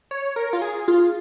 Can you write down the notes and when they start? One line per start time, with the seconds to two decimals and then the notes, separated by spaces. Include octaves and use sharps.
0.11 C#5
0.36 A#4
0.53 F4
0.62 G#4
0.88 F4